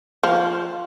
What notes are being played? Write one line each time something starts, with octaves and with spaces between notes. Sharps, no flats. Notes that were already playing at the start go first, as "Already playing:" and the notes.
F3